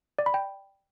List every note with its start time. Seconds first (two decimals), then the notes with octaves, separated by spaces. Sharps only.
0.19 D5
0.26 B5
0.34 G5